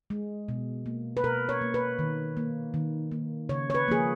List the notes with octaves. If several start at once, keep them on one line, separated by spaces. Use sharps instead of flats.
G#3
B2
A#3
B4
B2 A#4
C#5
A#3
B4
D#3
A#3
D#3
A#3
C#3 C#5
C#5
B4
F3 A#3 G#4